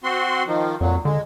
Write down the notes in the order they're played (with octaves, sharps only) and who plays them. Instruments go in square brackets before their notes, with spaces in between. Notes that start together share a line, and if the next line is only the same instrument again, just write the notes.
[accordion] C4 F#4 C6
D#3 F3
[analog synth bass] F2 [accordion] A#2 F#3
[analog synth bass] D3 [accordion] G#3